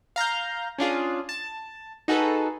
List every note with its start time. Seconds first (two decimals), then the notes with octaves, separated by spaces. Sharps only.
0.16 F5 A#5 F6 G6
0.78 C#4 D4 F4 G#4
1.29 A5
2.08 D#4 F#4 G#4 A4 B4